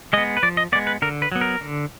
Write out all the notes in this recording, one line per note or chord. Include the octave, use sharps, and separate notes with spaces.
G#3 B3 D#5
B4
F3 D5
D#5
G#3 B3 D5
B4
D3 A#4
B4
F#3 B3
A#4
D3